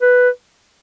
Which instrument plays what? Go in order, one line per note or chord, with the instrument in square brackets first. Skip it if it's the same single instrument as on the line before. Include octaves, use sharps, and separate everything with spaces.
[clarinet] B4